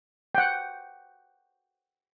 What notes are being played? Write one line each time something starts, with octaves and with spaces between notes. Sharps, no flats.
F#5 G5